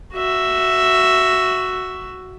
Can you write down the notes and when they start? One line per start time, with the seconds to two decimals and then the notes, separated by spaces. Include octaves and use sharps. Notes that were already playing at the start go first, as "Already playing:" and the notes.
0.14 F#4 E5